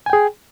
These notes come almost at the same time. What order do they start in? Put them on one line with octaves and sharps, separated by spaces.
G#5 G5 G#4